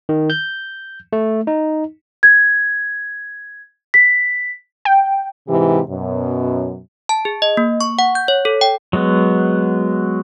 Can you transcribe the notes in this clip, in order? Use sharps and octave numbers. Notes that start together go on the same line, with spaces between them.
D#3
G6
A3
D#4
G#6
B6
G5
G#2 C3 E3 G4
F#2 B2
A5
G#4
D#5
A#3
C#6
F#5
G6
C#5
A4
G5
F#3 G#3 B3